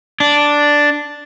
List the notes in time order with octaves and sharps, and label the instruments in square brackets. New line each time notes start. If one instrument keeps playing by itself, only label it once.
[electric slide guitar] D4